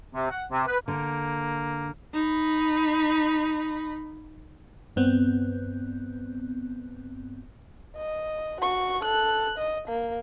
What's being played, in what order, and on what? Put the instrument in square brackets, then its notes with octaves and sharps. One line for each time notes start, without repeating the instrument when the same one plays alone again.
[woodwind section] C3
F#5
C3
B4
[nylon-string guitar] D3 [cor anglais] A#3
[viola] D#4 B5
[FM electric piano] G2 B3 C4
[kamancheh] D#5
F#4 C#6
A4 F#6
D#5
A#3